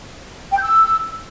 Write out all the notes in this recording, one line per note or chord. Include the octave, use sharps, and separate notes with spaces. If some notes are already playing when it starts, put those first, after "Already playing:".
G5
G6
E6